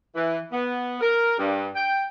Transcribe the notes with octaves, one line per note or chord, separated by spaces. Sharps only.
E3
B3
A#4
G2
G5